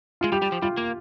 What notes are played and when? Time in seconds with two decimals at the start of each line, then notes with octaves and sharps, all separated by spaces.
0.21 G#3 F4
0.32 G3 G4
0.42 G3
0.52 F3
0.62 G3 F4
0.77 A#3